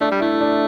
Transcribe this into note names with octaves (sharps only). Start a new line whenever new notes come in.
A3 D4
G3
A3 E4
D4